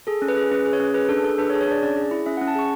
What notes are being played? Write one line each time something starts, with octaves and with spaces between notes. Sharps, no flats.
G#4 A4
C#4
B4
G#4
C#4 B4
G#4
C#5
C#4
G#4 B4
D4 A4
G#4 A4
D4 B4
C#5
G#4
C#5
D4 D5
C#4 D5
G#4
E4
C#4 E5
F#5
C#4
A5
G#4 C#6